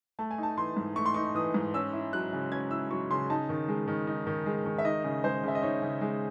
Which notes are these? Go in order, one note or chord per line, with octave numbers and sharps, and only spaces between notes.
A3 A5
G#5
D#4 A5
E3 C6
G#2
A3 C#6
C6
D#4 C#6
E3 D#6
G#2
C#4 E6
E4
F#3 F#6
C#3
C#4 G#6
E4 E6
F#3 C#6
C#3 C6
D#4 A5
D#3
G#3
D#3
D#4
D#3
G#3
D#3
E5
D#4 D#5
C#3
G#3 C5
C#3 E5
D#5
D#4 C#5
C#3
G#3